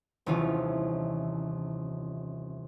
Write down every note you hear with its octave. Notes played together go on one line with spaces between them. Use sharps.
D#1 C2 C3 E3 C#4 F4